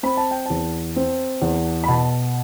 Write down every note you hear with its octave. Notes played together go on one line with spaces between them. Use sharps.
C4 B5
A5
G5
E2 A5
C4
E2
B5
B2 A5